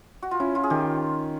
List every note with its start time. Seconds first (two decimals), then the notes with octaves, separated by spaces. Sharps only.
0.22 F#4
0.31 F4
0.40 C#4 E4
0.55 F4
0.63 G#4
0.70 D#3 G4